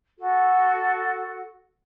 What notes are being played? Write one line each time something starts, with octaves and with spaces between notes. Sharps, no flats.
F#4 A4